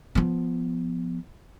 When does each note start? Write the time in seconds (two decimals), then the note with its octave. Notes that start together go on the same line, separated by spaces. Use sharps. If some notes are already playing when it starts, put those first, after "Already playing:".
0.15 F3 B3